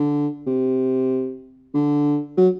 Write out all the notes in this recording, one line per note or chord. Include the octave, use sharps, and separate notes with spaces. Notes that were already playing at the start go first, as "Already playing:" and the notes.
Already playing: D3
C3
D3
F#3